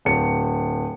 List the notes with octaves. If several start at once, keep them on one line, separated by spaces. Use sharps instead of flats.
D1 C#7